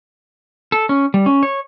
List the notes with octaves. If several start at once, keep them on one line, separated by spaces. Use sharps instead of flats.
A4
C#4
G3
C#4
C#5